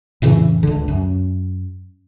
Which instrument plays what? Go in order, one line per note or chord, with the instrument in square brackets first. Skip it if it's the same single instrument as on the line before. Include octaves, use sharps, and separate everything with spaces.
[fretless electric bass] F2 A2 C#3 E3
C#2 D3
F#2